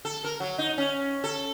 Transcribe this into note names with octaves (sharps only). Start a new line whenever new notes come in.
A4
A#4
F#3
D#4
C#4
A4